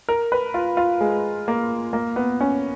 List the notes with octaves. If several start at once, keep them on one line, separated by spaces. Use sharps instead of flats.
A#4
B4
F4
F4
G#3
A#3
A#3
B3
C#4